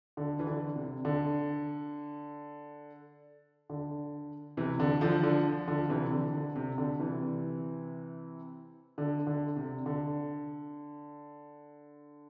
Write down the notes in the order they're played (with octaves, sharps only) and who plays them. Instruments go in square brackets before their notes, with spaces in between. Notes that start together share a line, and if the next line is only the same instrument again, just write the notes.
[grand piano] D3
E3
D3
C3
D3
D3
C3 E3
D3
D3 F3
D3 F3
D3 F3
C3 E3
D3
D3
C3
D3
C3 E3
D3
D3
C3
D3